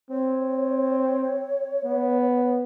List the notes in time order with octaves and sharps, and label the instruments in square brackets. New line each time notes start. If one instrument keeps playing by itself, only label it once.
[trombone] C4 [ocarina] C#5
[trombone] B3